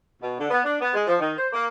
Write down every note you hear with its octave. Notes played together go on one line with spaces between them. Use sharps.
B2
D3
B3
D4
B3
G#3
F3
D#3
C5
A#3